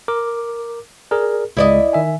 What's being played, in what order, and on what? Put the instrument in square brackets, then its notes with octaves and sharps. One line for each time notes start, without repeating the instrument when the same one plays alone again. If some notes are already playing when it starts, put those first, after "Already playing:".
[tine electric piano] A#4 D6
G#4 A#4 D5
[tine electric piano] C#2 G#3 [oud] E4 D5 D#5
[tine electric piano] D#3 E5 G#5